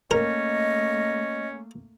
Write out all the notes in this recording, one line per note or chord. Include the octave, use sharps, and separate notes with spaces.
A3 A#3 C#4 A#4 D#5